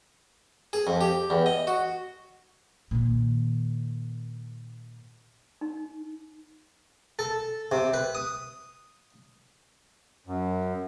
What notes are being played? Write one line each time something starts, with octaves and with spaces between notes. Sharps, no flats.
G#4
F2
G4
E2
D#5
F#4
A#2 D#3
D#4
A4
C3
B4
D#6
F#2